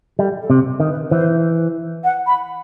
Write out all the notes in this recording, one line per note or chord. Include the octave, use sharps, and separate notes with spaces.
G3 A4
A4
C3
D#3
B4
E3 C5
F#5
B5